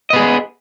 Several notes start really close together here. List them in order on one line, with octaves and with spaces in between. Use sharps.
D#5 B3 G#4